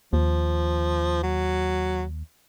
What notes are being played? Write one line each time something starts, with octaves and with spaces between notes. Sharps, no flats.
D#2 F3
F#3